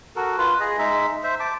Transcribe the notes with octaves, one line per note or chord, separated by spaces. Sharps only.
F#4 A4 A#4
F4 B4
G#4 D#5
G#3 D#4 E5
C5 E5
A5 D6